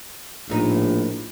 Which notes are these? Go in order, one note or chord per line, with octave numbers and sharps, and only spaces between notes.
A#1 A2 D#4